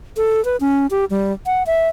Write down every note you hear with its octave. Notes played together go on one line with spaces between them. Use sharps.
A4
B4
C#4
G4
G3
F#5
E5